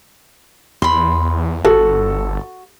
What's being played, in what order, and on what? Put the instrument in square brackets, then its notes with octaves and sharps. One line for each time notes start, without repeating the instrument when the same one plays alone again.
[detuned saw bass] E2 [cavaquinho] B5 C6
[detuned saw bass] G1 [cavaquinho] F#4 [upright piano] A4